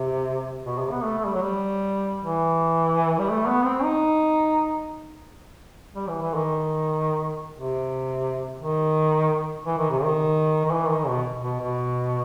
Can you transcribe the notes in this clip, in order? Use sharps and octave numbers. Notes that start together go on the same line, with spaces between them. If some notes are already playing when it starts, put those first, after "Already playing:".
Already playing: C3
B2
C3
B3
A3
A3
G3
F#3
G3
E3
G3
A3
B3
C4
D#4
G3
E3
E3
D#3
C3
D#3
E3
D#3
C3
D#3
D#3
E3
D#3
B2
B2
B2